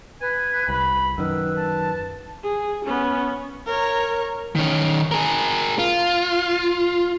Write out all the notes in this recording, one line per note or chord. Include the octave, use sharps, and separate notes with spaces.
B4 G#5
C2 B5
F#2 D#3 B4 E6
A5
G#4
B3 C#4
A#4 C#5
D#3 C#4
G#4 A#4
F4